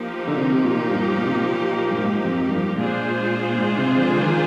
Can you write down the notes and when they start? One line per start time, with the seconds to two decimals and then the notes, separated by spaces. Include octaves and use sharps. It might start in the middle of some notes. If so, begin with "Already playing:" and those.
Already playing: F3 A#3 D#4 G4
0.28 D3
0.37 C3
0.64 A#2
0.91 G2
1.18 A#2
1.26 C3
1.35 A#2
1.91 G2
1.98 G#2
2.24 F2
2.51 G2
2.77 A#2 G#3 D4 F4 G#4 C5
3.58 G#2
3.78 C3
3.97 D3 F3
4.18 D#3